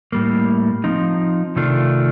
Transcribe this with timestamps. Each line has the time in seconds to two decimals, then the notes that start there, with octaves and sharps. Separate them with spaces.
0.12 A2 G3 A#3
0.84 F3 C4 D#4
1.56 C3 D#3 A3 D4 F4